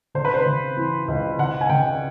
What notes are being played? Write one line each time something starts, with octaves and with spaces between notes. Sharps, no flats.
C#3 C5
B4
C5
C#3
E3
C#2
C#3 F#5
G#5
C#3 G5